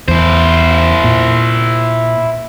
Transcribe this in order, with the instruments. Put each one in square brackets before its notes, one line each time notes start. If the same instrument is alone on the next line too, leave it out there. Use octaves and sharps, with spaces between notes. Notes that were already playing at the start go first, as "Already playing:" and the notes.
[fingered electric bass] E2 [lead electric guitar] E4 C5
[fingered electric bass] A#2